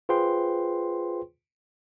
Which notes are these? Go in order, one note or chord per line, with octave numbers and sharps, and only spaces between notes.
F4 G#4 B4 C5 G5 C6